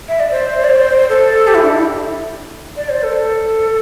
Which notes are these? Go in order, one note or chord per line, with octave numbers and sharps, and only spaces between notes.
E5
D5
C5
D5
C5
A4
G4
E4
D4
E4
D5
C5
A4